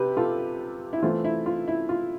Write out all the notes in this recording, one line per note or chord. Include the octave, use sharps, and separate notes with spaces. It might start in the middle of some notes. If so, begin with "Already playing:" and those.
Already playing: C3 G4 B4
F4 A4
E4
E3 A3 C4 F4
E4
F4
E4
F4